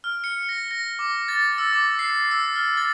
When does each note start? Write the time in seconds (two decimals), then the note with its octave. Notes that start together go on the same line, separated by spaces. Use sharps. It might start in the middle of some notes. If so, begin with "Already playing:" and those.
0.04 F6
0.24 C#7
0.49 A#6
0.71 A#6
0.99 D6
1.28 A6
1.58 E6
1.73 D6
1.99 C7
2.31 E6
2.56 F6
2.77 A6